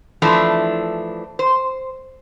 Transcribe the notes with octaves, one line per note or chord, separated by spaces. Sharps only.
E3 F3 A3 D4 E4
C5